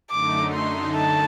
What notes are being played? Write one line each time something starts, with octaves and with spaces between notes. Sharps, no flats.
F#2 D3 A3 D#4 D6
C6
A5